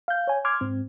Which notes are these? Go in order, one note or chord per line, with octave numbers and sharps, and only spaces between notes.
F5 G6
C#5 G#5
C6 D6 F6 G#6
G#2 C4